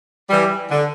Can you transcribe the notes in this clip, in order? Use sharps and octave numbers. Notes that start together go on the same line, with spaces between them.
E3 G3
D3